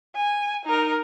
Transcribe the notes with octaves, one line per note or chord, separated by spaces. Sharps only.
G#5
D#4 A#4